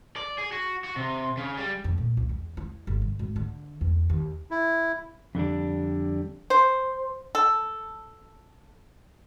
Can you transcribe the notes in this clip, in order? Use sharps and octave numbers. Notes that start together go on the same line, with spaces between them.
D5
G#4
F#4
F#4
C3
C#3
G3
F2
A#2
C#2
E2
E4
G1
C3
G#1
D3
E2
D#2
E4
F2 D3 G3 D4
C5
A4